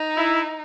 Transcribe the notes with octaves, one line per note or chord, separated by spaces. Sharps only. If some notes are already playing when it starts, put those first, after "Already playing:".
Already playing: D#4
E4